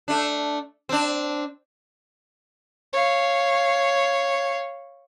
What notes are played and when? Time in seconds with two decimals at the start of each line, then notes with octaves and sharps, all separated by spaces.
0.08 A3 D4
0.89 C4 D4
2.93 C#5 F5